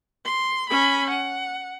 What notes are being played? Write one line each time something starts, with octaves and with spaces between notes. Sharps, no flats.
C6
C#4 B5
F#5